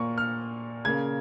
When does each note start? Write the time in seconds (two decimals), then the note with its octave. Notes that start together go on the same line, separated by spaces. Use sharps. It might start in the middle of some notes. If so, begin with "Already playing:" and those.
Already playing: A#2 A#3 C#6
0.18 F6
0.85 C#3 A#3 G#6